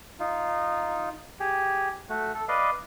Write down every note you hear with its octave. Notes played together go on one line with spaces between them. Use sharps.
D#4 F4
G4 G#4
A3 F#4
A4
B4 D5 D#5 F5